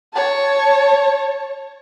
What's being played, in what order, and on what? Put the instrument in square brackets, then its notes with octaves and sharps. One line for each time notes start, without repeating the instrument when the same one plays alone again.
[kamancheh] C#5 A5